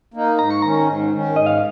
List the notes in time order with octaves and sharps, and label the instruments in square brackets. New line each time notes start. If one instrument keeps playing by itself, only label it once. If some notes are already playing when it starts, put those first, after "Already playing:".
[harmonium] A#3 D#4
[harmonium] G#2 [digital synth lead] A#5
[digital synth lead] C#6
[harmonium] D#3 C#4 [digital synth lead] A#5
[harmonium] G#2
D#3 C#4
[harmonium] G#2 [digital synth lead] D#5
[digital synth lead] F5